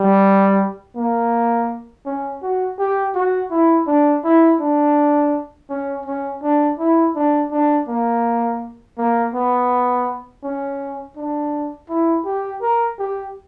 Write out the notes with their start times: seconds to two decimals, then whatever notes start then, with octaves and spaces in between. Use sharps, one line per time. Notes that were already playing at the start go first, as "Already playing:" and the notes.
Already playing: G3
0.96 A#3
2.06 C#4
2.42 F#4
2.79 G4
3.15 F#4
3.51 E4
3.87 D4
4.24 E4
4.60 D4
5.70 C#4
6.06 C#4
6.42 D4
6.79 E4
7.15 D4
7.51 D4
7.88 A#3
8.98 A#3
9.34 B3
10.44 C#4
11.17 D4
11.89 E4
12.25 G4
12.62 A#4
12.98 G4